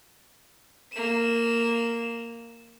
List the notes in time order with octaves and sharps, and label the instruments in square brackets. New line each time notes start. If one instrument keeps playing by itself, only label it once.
[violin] A#3 E7